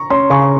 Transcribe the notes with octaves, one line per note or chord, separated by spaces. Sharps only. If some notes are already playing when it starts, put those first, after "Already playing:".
Already playing: A#5 C#6
C#4 C6
C#3 C#6